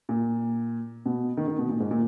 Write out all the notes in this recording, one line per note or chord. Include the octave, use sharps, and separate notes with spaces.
A#2
B2
D#3
D#3
B2
A#2
G#2
A#2